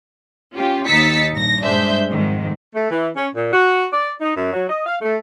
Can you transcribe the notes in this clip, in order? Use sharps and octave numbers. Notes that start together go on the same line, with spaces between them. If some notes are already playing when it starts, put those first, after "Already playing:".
C#4 F4 G4
D#2 D#4 E6 A6 B6 C#7
A#1 G2 A#6
G2 G#3 D4 C5 E5 G6
F2 G#2 D#3
A3
E3
C#4
A#2
F#4
D5
D#4
F#2
F#3
D#5
F5
A3